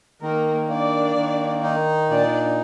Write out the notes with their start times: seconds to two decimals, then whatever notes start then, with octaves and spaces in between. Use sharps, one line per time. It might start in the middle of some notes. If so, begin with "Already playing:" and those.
0.21 D#3 A#3 A#4
0.68 A#3 D4 D5
1.16 D#3
1.63 D#4
2.10 A#2 D4 D5